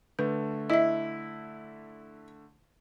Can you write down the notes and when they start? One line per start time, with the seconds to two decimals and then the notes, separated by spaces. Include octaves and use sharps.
0.19 D3 A3 B4
0.70 E4 D#5 E5